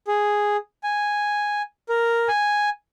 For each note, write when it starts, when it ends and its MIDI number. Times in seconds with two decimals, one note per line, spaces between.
0.08 0.57 68
0.83 1.62 80
1.89 2.28 70
2.28 2.69 80